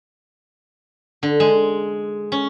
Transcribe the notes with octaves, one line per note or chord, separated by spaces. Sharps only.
D3
G#3
C#4